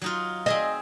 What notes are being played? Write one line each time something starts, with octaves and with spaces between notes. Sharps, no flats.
F#3 D#4 F4
C4 G#4 D#5 E5